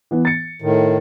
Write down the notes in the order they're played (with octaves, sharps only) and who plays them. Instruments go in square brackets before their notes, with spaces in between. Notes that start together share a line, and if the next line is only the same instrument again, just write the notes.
[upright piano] E3 B3
A6 C#7
[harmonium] A2 D#3